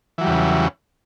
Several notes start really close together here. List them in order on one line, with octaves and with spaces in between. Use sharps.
E3 F#3 G3 E2 C#3